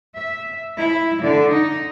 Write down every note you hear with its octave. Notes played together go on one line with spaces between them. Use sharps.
E5
E4
D3
D#4